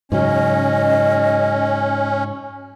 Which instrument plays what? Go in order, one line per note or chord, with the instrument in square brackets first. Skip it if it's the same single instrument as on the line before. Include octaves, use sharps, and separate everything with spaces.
[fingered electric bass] G#2 C#3 F#3 [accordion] C#4 [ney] D#5